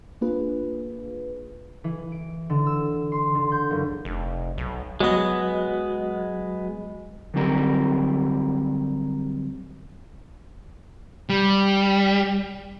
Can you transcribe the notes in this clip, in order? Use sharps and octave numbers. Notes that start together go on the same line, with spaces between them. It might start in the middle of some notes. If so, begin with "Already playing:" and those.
A#3 D4 F4 G#4 B4
E3
D7
D3
E6
C6
D3
G6
F#1
F1
B1
F#3 G#3 B3 F#4 D#5
D3 F#3 G3 C4 G4 A#4
G3